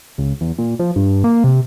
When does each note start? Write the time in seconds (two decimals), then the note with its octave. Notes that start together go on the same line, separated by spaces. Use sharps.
0.18 C#2
0.41 E2
0.58 A#2
0.79 F3
0.96 G2
1.24 A#3
1.44 C3